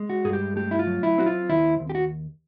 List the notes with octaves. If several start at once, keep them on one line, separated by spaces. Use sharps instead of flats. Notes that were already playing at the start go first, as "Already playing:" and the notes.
Already playing: G#3
F#4
G2 G#4
G4
A3 G4
E4
F4
F#3
E4
C4 F#4
F4
D#2 E4
D#2
G4
F#4